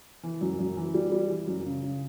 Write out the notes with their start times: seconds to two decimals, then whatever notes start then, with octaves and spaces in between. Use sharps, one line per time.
0.23 E3
0.41 F#2
0.59 F#2
0.77 E3
0.94 G3
1.12 G3
1.30 E3
1.48 F#2
1.65 C#3
1.83 C#3